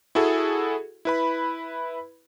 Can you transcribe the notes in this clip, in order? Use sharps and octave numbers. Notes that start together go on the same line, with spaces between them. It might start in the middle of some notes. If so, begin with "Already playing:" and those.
E4 F#4 G#4 A4
E4 B4 B5